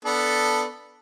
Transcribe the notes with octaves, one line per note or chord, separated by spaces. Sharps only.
B3 D4 A4